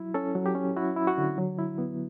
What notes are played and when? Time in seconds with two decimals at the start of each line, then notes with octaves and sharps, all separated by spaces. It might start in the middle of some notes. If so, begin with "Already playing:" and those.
Already playing: F#3 E4
0.14 C#4 A4
0.35 F#3
0.46 G4
0.55 C#4
0.77 E4 F#4
0.96 E4
1.07 F#4
1.18 D3
1.38 F#3
1.58 E4
1.78 B3